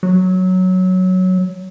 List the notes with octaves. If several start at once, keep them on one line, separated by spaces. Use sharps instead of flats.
F#3